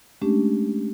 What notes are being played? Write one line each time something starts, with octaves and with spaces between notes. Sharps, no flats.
G#3 A3 C#4 D4 G4